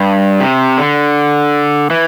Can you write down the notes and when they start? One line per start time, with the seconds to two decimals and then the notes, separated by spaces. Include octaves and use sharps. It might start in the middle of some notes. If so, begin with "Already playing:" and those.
Already playing: G2
0.40 C3
0.78 D3
1.90 E3